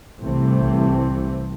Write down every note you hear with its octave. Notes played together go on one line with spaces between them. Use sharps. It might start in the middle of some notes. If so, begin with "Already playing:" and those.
C2 C3 E3 A3 C4